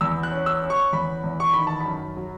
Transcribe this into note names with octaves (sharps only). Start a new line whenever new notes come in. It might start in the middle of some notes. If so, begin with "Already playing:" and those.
E2 E6
F#6
C#4
E6
C#4
C#6
E2 B5
E2
C#6
D#3 B5
A5
F#2 B5
F#3